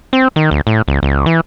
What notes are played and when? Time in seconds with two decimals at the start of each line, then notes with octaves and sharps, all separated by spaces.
0.13 C4
0.36 D#3
0.51 D2
0.67 A2
0.88 C#2
1.03 C#2
1.26 E3